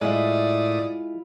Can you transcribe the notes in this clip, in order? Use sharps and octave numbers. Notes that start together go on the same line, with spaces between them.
A2 G#3 E4 F4 D5 E5 D#6